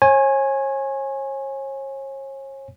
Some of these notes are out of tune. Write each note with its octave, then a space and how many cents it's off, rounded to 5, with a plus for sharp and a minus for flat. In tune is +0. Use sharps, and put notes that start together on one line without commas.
C#5 -40 G#5 +0